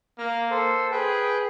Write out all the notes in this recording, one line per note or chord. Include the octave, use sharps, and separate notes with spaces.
A#3 F6
A4 C5
G#4 B4 G5